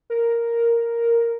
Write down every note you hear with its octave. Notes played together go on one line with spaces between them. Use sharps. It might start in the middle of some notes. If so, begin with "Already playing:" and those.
A#4